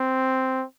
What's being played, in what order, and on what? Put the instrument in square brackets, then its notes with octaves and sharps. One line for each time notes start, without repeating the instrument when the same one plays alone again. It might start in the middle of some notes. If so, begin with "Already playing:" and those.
Already playing: [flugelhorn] C4